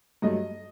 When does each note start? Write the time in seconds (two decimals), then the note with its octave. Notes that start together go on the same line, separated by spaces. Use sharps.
0.22 G2 F#3 A3 D#5